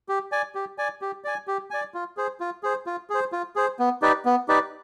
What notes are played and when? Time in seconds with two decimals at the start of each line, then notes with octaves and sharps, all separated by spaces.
0.09 G4
0.32 D5 G#5
0.55 G4
0.78 D5 G#5
1.01 G4
1.24 D5 G#5
1.48 G4
1.71 D5 G#5
1.94 F4
2.17 G#4 C5
2.40 F4
2.63 G#4 C5
2.86 F4
3.10 G#4 C5
3.32 F4
3.56 G#4 C5
3.79 B3
4.02 D#4 G4 B4 D5
4.25 B3
4.48 D#4 G4 B4 D5